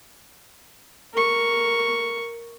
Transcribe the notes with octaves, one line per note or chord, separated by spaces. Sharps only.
A#4 C#6